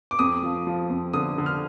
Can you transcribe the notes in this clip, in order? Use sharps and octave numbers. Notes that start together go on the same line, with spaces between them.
D6
F2 D#6
F3
F3
F2
D3 D#6
D3
F6